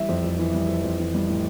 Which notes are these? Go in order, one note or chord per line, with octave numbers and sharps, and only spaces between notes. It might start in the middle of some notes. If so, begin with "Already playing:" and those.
Already playing: E3 G3 E5
F2
F2
E3
G3
F2
F2
E3
G3
A2